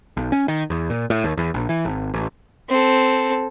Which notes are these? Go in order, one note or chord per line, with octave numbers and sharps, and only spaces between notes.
B1
C#4
D#3
E2
A#2
A2
D#2
E2
A#1
E3
G#1
A1
C4 A4